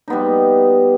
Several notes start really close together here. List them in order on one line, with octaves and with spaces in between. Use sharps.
D#4 B3 G3